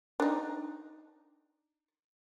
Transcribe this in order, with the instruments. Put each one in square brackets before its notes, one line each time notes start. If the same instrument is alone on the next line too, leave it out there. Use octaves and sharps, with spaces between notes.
[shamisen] D4 D#4